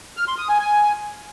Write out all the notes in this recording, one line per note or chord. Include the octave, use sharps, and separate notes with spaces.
F6
C6
D#6
G#5
G#5